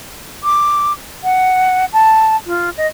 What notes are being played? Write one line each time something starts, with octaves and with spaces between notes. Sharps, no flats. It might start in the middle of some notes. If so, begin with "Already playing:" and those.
D6
F#5
A5
F4
D#5